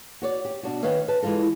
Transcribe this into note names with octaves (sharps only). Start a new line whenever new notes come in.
F#4 C#5 D5
G4
B2 D4 F#4
D#3 B4 C#5 D#5 F5
B4 A5
E3 G#3 A#3 F4 A4